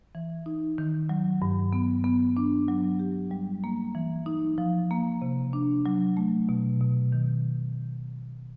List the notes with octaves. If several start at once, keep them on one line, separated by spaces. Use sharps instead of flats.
E3
D#4
D#3
F#3
G2
B3
B3
D4
F#3
G4
G3
A#3
E3
D#4
F3
A#3
C3
D4
F#3
A3
B2
B2
D#3